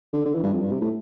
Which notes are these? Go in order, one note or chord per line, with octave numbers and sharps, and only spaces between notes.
D3
D3
E3
G2
F2
G2
C3
A2